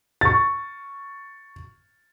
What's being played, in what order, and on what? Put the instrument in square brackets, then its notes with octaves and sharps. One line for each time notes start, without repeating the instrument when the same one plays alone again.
[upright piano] C#6 A6